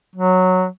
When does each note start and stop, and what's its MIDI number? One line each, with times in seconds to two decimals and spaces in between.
0.16 0.66 54